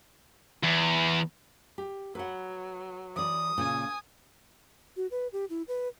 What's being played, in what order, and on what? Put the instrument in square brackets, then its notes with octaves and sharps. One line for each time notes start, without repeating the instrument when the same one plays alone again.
[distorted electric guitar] E2
[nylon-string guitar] G4
[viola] F#3 [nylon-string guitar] B4 F#5
[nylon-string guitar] E3 D5 [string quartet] D#6
[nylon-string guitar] A#2 C#3 F4 [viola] G#5
[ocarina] F#4
B4
G4
E4
B4